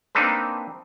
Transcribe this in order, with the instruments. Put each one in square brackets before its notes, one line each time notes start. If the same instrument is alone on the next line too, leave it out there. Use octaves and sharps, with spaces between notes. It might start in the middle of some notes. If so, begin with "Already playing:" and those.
[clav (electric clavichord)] A#3 C4 D4 D#4 A4 B4